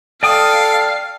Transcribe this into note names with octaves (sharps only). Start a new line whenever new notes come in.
A4 D5 F5 G5 D#6